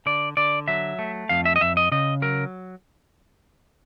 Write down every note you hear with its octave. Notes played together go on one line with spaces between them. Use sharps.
D3 D5
D3 D5
F#3 E5
A3
F2 F5
E5
D#5
F2 E5
D#5
C#3 D#5
F#3 A#4